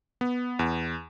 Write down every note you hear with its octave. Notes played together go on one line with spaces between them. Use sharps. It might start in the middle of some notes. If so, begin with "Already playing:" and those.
B3
E2